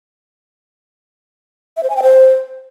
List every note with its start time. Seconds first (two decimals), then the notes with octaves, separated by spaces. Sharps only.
1.77 E5
1.83 C5
1.90 G#5
1.96 G5
2.03 C5